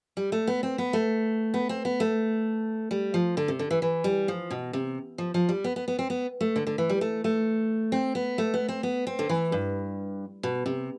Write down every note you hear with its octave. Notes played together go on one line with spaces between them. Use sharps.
G3
A3
B3
C4
B3
A3
B3
C4
B3
A3
G3
F3
D3
C3
D3
E3
E3
G3
F3
B2
C3
F3
F3
G3
B3
B3
B3
C4
B3
A3
D3
D3
E3
G3
A3
A3
C4
B3
A3
B3
C4
B3
C4
D3
E3
G2
B2
C3